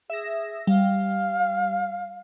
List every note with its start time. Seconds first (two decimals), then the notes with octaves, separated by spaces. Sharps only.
0.10 G#4 E5 A#6
0.67 G3 F5